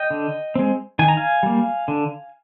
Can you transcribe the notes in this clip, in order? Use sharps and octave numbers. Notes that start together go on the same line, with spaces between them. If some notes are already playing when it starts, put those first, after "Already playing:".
Already playing: D#5 G5
D3
G#3 C4
D#3 G#5
A#5
F5 G#5
G3 A#3
D3